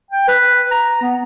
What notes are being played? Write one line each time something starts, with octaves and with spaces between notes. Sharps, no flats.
G5
B4
A#5
B3